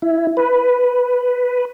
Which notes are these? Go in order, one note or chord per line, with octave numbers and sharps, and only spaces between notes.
E4
B4